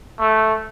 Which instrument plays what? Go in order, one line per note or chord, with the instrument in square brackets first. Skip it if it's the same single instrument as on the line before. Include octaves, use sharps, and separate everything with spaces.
[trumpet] A3